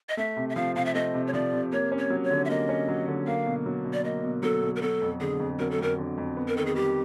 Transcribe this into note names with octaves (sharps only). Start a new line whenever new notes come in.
D#5
A3 E5
C3
E5
F3 F5
C3 F5
E5
A3 D#5
C3
C#5
F3 D5
C3
A#3 C#5
C#4
C#5
F#3
C#5
D3
E5
A#3 D#5
C#4
F#3
D3
A#3 F5
B2
F#3
B2
D5
A#3 D#5
B2
F#3 A4
B2
A#4
F#3 A4
F2
D3 G#4
F2
F#3 A#4
A4
F2 A#4
D3
F2
B3
A#4
D#3 A4
G#4
G3 G4